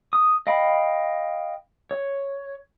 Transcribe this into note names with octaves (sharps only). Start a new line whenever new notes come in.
D#6
D#5 F5 G5 B5
C#5